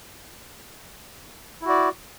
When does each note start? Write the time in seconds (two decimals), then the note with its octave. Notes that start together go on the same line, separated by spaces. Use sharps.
1.61 E4
1.65 F#4
1.69 D5